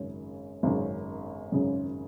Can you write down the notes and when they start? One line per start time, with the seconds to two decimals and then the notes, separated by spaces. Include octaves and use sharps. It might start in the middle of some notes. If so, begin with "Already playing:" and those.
Already playing: G#1 F#2 C#3
0.63 G#1 F#2 C#3
1.52 G#1 F#2 C#3